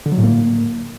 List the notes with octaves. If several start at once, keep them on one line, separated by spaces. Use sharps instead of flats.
D3
F#3
A2
A#3